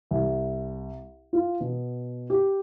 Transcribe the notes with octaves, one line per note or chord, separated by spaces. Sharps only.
C2
F4
B2
G4